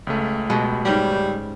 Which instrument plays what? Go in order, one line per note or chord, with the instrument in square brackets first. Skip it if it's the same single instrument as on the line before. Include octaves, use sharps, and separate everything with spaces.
[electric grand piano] C#2 C#3 A3
[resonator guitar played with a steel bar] B2 [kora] G#3 F#4 G4
[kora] G#2 C#4 G4 [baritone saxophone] G3